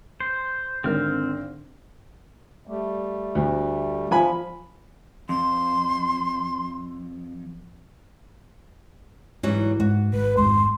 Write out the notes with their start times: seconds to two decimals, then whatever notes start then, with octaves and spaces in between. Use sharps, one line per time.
0.20 C5
0.84 G#1 D3 C4 A#4 F6
2.67 G3 A3
3.35 D2
4.11 F3 G#5 B5
5.29 F2 C6
9.43 G#2 E3 F#3 G3
9.80 G#2 F#4
10.13 G#1 B4
10.37 G#1 F2 G#2 C6